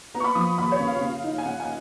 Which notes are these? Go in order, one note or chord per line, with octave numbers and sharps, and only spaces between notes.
B3 A#5
C#6
B5
F3 D#6
D#2 B5
C#5
C#3
F5
C#3
D#4
G#5
C#3 F#5
G#5